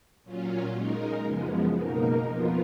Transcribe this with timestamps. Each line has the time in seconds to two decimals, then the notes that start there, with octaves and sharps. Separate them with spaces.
0.24 A#2 F#3 C#4 F4
0.74 G#3 D#4 A#4
1.24 F#2 C#3 F3 G#3 B3
1.76 B2 A#3 D#4 A#4
2.26 F2 F3 B3 F4